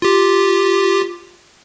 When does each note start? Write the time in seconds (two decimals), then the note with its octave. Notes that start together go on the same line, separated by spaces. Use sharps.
0.02 F4 G4